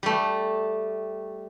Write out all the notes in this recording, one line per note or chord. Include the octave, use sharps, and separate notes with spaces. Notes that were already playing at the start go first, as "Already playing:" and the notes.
G3 A3